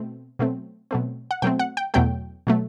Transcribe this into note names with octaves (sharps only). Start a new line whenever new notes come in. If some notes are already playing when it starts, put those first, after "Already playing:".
Already playing: B2 A3 C4
B2 F#3 A3 C4
B2 F#3 A3 C4
F#5
B2 F#3 A3 C4 G5
F#5
G5
E2 B2 F#3 A3 G5
B2 F#3 A3